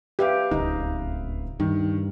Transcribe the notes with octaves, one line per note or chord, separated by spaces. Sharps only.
G4 B4 E5 F5
D1 C#2 D#4
G2 D#3